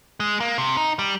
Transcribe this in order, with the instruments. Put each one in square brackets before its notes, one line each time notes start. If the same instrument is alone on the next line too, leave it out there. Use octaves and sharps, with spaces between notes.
[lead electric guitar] G#3
A#3
C3
D#4
G3